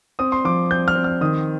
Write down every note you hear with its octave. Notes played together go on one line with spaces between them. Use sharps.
C4 D#6
C6
F3 D6
C4 G6
F6
C4
F6
D#3 D#6